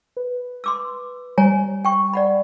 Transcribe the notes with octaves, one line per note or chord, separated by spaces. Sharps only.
B4
C6 D6 E6
G3 C#5 G#5 A#5
G5 C#6
D5 F#5 B5